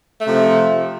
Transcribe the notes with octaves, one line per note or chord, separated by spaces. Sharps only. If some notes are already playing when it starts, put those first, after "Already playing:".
C3 F3 A3